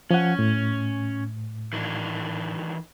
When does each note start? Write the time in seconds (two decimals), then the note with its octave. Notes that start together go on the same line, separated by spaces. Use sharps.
0.11 F3 C#4 F#5
0.39 A2
1.73 D#3 E3 D4